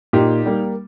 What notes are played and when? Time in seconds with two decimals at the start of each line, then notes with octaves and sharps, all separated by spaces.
0.13 A#2 D#4 G4
0.46 G3 A#3